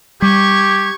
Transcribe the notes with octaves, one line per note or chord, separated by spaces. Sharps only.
G3 G4 C#6 G#6